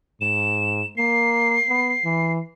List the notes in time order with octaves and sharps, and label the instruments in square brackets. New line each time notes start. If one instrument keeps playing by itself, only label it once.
[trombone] G#2 [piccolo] E7
[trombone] A#3 [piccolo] C7
[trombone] B3
E3